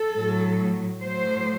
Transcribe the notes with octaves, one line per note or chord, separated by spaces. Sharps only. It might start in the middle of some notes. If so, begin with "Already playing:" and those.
Already playing: A4
A2 F#3
A2 F#3 C5